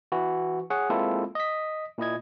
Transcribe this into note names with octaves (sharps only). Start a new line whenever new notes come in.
E3 E4 F#4
G#4 C#5 F#5
G#3 A#3 C4 E4 F4 A4
D#5 B6
A#2 E4 D#5 G#6